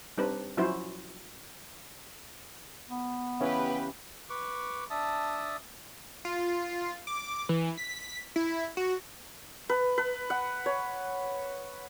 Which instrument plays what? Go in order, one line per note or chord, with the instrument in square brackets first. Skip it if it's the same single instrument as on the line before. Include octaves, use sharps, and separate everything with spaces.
[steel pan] G3 C4 D4 D#4 B4
F3 F#3 C#4 E4 F#4 C5
[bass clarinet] B3
[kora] C#3 E3 C#4 [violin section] G4 B4
[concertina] B4 C#6 D6
D4 E5 A5 D#6
[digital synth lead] F4
D6
E3
B6
E4
F#4
[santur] B4
B4
F#5
C#5